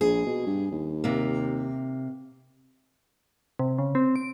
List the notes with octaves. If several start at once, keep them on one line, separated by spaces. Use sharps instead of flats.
A#1 G#4
B2
G2
D#2
C3 A#3
C3
C#3
C4
D7